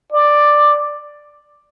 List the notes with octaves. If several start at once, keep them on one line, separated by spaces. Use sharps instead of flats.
D5